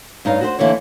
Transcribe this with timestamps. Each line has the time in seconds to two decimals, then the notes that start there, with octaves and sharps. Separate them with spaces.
0.25 G2 D#4 C#5 F5
0.41 F#4 G#4 C5
0.59 D3 E3 A#3 C4 C#5